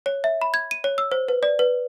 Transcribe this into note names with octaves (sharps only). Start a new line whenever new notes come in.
C#5
E5
B5
G#6
D#7
C#5
E6
C5
B4
D5
B4